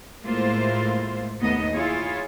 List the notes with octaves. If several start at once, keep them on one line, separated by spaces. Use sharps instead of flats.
A2 G#3 A#3 E4 F4 C5
D#2 A3 B3 D#5
E4 F4 G#4 C#5